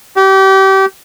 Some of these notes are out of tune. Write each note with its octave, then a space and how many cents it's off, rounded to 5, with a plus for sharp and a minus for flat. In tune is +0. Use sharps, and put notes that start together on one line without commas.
G4 -30